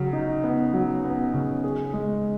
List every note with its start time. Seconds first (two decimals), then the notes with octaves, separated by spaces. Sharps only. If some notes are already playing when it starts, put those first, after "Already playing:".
Already playing: C#3 F#3
0.13 D#4
0.43 B3
0.73 F#3
1.04 B3
1.34 C#3
1.64 G#4
1.94 G#3